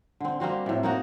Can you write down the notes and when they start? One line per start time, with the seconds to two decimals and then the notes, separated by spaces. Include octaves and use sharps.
0.20 D3 C4
0.40 G3 A#3 C4 F#4
0.66 A2 C3
0.83 A#3 D#4 F#4